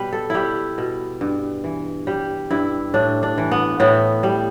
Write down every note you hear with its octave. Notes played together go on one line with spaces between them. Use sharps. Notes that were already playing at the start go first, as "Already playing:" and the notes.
Already playing: B2 G3 B4
A4
G3 E4 G4
B2
G2
E3
G3 G4
G2 E4
A2 D4
D4
E3
B3
A2 B3
G3